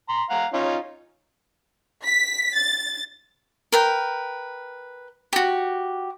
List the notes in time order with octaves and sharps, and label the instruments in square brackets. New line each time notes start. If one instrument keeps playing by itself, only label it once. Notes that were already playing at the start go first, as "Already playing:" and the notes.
[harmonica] A#5 C6
F5 F#5 A#5
C#4 D#4 F4
[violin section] B6
A6
[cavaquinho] A#4 B4 G5
F#4 G4